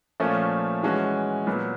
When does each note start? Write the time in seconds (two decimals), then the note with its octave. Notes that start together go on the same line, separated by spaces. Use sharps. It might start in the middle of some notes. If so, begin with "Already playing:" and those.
0.20 A#2 F3 A3 C#4 F4
0.83 E3 G#3 C#4 F#4
1.47 A#2 F#3 B3